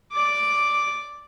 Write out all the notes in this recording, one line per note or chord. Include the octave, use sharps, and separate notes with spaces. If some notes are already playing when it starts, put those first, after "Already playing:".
D5 D6